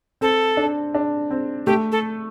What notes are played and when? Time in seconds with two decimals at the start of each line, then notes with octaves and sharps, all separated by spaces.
0.21 C4 A4
0.57 D4
0.94 D4
1.31 C4
1.66 A3 G4
1.92 A4